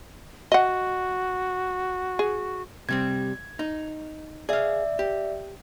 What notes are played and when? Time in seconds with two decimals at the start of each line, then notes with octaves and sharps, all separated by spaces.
0.52 F#4 D#5 F#5
2.19 G#4
2.89 C3 G3 C4 G#6
3.59 D#4
4.49 G#4 D5 E5 F5
4.99 G4